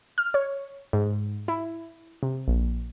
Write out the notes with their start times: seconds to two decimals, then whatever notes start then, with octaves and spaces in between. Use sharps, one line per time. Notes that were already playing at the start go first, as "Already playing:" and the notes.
0.18 F6
0.34 C#5
0.93 G#2
1.48 E4
2.23 C3
2.48 A#1